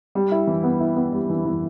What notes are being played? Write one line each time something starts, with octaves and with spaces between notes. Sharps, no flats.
G3
E4
E3
B3
E4
B3
G3
E3
E3